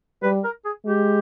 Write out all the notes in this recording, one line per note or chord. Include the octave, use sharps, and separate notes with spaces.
G3 B4
A#4
G#4
G#3 G4